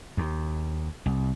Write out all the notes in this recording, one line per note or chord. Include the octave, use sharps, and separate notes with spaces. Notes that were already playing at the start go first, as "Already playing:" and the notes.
D#2
C2